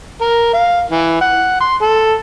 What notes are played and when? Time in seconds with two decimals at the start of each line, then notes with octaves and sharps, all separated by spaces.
0.21 A#4
0.54 F5
0.91 E3
1.21 F#5
1.61 C6
1.82 A4